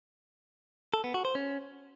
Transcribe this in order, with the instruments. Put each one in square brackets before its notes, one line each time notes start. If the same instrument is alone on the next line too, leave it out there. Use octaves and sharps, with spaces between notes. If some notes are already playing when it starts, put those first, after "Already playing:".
[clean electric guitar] A4
B3
F#4
C5
C#4